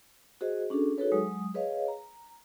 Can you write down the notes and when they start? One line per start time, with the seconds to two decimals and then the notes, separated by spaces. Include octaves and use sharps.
0.41 F#4 G#4 C5 D#5
0.70 C#4 D4 F#4 G#4 A4
0.98 D#4 F#4 G#4 A4 B4 C#5
1.12 F#3 G#3 D#6
1.54 G#4 B4 C#5 D#5 F5
1.88 A#5